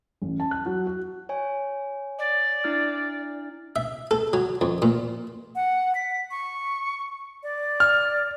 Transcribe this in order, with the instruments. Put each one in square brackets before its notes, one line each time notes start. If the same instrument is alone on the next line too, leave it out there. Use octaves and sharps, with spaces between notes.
[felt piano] A1
A5
F#6
F#3
F#4
[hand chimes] C#5 G#5
[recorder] D5
[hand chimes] D4 E4 F6
[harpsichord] E5
A4
F#3
F2
A#2
[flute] F#5
B6
C#6
D5
[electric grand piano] F6